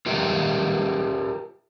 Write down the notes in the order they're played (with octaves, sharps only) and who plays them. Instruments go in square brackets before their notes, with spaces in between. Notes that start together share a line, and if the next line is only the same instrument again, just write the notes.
[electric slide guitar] F4 G4 A#4 B4 E5